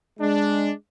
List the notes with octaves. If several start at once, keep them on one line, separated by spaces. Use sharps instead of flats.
G#3 D4